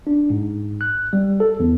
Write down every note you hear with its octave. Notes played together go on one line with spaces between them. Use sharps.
D4
G#2
F#6
G3
A4
E2